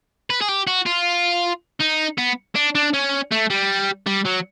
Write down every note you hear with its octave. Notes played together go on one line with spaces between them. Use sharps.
B4
G#4
G4
F#4
F4
D#4
B3
D4
D4
C#4
A3
G3
G3
F#3